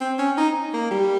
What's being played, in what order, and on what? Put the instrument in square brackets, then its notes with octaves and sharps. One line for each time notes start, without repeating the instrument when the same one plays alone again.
[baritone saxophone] C4
C#4
D#4
A#3
G3